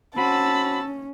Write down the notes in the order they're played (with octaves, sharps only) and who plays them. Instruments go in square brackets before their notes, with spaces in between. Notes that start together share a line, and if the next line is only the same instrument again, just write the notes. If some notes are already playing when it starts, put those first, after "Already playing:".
[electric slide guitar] C4 F#4 [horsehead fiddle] C#4 [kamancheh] A5 E6 [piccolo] B5